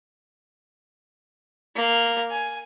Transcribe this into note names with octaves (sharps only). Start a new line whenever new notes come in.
A#3
G#5